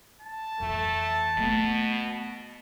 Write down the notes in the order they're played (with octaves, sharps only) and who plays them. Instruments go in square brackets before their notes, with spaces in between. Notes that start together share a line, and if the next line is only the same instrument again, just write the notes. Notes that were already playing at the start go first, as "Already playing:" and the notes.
[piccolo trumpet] A5
[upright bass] F2 E3 [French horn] A3
[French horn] B2 [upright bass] A3 B3